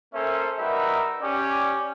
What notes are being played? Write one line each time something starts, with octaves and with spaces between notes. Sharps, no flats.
A#3 C#4 A4 C5 E5
G3 D#4 F#4 A#4 B4 E5
C#4 G4 D5